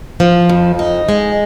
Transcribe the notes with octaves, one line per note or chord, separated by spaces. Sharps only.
F3
F2
D#4
G#3